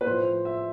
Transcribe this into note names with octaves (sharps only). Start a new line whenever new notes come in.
B4
A2 F3 C5
E5